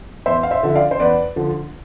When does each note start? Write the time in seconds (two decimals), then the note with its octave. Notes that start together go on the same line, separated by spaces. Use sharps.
0.26 E2 C5 E5
0.43 F5
0.51 C5 E5
0.63 D3 F3 E5
0.75 D5 F5
0.91 C5
1.00 E2 B4 D5
1.36 D3 F3